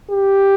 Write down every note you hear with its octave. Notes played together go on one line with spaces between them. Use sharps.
G4